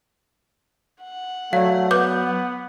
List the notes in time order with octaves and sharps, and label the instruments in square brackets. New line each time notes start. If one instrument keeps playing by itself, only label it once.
[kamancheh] F#5
[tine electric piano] F#3 [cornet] A3 [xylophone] D5 F5
[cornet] B3 [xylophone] B4 D6 G6